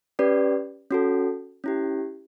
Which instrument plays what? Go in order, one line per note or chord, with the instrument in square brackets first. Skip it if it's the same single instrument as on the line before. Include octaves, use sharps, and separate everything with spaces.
[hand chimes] C#4 G4 B4 D5
C#4 F#4 A4
C#4 E4 G4